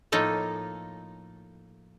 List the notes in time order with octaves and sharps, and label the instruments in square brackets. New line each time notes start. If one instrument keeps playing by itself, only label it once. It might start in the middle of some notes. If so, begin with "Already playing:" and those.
[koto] A2 F3 A#3 D#4 A4 C#5